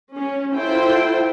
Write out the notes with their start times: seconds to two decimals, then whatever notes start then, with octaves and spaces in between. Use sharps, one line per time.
0.13 C#4
0.55 E4 F4 A4 C5 G5